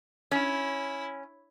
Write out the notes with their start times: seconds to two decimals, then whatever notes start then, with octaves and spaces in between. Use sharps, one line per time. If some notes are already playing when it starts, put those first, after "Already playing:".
0.32 C#4 E4